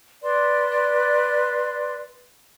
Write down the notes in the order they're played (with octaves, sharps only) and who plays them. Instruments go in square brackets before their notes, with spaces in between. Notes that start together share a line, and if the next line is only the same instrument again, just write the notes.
[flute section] B4 D5 C6